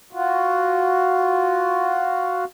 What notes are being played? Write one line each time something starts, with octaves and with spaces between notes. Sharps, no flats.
F4 F#4